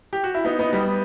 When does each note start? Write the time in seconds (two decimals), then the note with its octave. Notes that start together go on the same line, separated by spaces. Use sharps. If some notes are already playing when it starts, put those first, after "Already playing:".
0.13 G4
0.24 F#4
0.35 E4
0.45 B3 D#4
0.59 B3 D#4
0.72 G3 B3